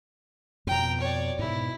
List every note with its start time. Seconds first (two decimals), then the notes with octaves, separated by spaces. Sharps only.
0.67 F2 B2 G5 A#5
1.01 C#5 D5
1.39 G#2 B2 E4